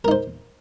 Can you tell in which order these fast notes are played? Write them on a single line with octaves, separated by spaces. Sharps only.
A#4 D#4 C5